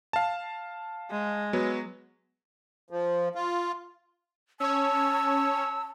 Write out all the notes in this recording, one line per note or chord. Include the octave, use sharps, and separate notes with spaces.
F5 A5
G#3
F#3 B3
F3
F4
C#4 C#5 A5 E6